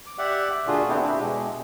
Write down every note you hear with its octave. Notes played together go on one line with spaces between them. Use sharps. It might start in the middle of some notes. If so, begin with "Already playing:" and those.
D6
G4 D5 E5 F#5
A#2 D3 D4 F4 F#4 G#4
A3 B3 C4 D4 E4 G4
D4 E4 G4
B2 G#3